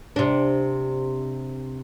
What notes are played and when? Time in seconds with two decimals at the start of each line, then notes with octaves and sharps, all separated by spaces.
0.16 C3 D4